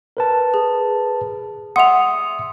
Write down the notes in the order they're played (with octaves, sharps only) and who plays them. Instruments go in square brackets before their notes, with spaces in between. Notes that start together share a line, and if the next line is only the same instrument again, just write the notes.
[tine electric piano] A#4 B4 A5
[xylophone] G#4
[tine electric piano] E5 C6 D#6 [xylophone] F#5 F7